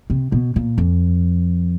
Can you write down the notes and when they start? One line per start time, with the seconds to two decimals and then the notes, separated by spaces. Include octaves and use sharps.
0.10 C3
0.32 B2
0.56 A#2
0.78 F2